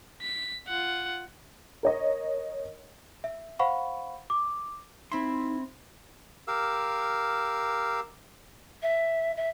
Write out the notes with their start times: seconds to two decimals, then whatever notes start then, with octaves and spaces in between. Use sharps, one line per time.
0.22 B6
0.68 F4 F#5
1.83 A#4 C#5 D#5
3.24 E5
3.59 C5 F5 F#5 B5 C#6
4.30 D6
5.12 C4 D#4 E4 B5 C6
6.48 G4 A#4 F5 E6
8.82 E5
9.36 E5